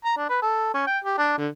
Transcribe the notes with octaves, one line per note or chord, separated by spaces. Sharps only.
A#5
D4
B4
A4
C#4
G5
G4
D4
D3